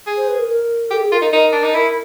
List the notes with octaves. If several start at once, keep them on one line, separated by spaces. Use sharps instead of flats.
G#4
C5
B4
A#4
A#4
G4 A4
G#4
F4 A#4
D#4 A#4
D#4 A#4
D4
D#4
E4 A#4